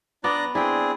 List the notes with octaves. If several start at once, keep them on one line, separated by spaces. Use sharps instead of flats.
B3 D4 D5 A#5 F#6
C4 D4 E4 G#4 G5